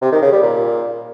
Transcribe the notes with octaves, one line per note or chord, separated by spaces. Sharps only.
C3
D#3
C#3
G3
A#2